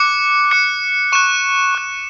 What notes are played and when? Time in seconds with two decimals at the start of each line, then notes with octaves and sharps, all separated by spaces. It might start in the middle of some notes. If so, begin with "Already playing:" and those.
Already playing: D6 F#6 C#7
0.51 D6 F#6 C#7
1.12 C#6 F#6 E7
1.75 C#6 F#6